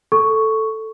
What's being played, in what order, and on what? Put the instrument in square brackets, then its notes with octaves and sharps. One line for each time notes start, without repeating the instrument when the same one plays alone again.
[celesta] A4 C#6